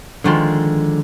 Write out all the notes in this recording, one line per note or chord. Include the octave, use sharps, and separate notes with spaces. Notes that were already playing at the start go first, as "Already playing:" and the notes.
D3 D#3 F3 G#3